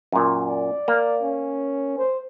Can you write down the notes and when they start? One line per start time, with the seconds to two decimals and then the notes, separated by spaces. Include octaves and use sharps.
0.12 F#2 A#2
0.48 D5
0.88 A#3
1.22 C#4
1.98 C5